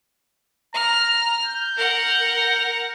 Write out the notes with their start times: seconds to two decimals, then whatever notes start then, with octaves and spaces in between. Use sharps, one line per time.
0.74 A#5 F6
1.45 G6
1.77 A#4 F#5